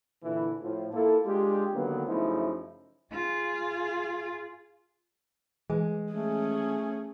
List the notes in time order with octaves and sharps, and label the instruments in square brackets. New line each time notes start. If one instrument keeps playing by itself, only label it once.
[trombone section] A#2 D3 E3 E4
A2 F3
A#3 E4 F4 A4
G#3 D4 F4 G4
D3 D#3 F#3 A#3 B3
F#2 C#3 F3 A3 D#4 E4
[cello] F4 G#4
[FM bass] E3 [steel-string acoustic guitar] G#3
[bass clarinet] A3 [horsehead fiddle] C#4 G#4